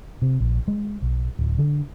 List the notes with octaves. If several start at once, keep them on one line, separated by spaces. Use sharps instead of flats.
C3
A#1
G#3
B1
D1
D3